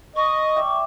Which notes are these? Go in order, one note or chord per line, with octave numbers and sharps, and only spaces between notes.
D#5 C#6
D5 E5 G5